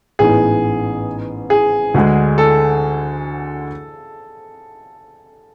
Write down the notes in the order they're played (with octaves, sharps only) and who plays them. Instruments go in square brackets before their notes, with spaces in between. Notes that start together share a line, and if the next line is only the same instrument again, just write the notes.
[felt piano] A1 G#2 E3 B3 [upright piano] G#4
[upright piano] G#4
[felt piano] D2 D3 G#3
[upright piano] A4